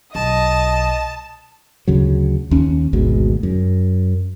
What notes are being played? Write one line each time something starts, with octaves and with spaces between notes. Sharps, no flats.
B1 D#5 A5
D2 C#3 F#3
D#2 C#4
G#1 D2 G#2 B2
F#2